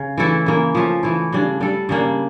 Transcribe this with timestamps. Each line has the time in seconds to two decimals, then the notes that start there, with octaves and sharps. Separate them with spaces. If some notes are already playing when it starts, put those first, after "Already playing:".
Already playing: C#3
0.18 E3 A3 E4 A4
0.46 C#3 E3 A#3
0.75 F3 A3 C#4
1.03 E3 A3 E4
1.33 C#3 G3 D4
1.61 G3 D4 A4
1.89 C#3 G3 A#3 D4